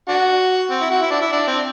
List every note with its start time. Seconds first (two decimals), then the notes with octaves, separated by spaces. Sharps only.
0.09 D4 F#4
0.71 C4
0.81 E4
0.90 F#4
1.02 E4
1.11 D4
1.22 E4
1.33 D4
1.48 C4